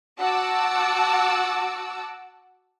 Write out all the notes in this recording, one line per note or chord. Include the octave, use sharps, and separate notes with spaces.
F#4 F#5 A5 D6 E6